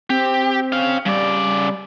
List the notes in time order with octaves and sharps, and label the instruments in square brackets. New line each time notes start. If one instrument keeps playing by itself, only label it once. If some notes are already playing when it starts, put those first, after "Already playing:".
[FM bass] C4 [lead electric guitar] G4
[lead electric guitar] C#4 F5
[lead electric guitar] C#3 D5 [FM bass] G3